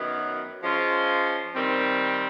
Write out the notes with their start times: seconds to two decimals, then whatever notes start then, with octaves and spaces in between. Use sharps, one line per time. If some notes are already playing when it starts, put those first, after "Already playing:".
Already playing: F#2 D#3 F#3 B3
0.61 F3 G#3 C#4 F4
1.54 D#3 G3 C4